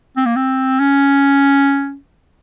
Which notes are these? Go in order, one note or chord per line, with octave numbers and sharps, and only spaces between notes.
C4
A#3
C4
C#4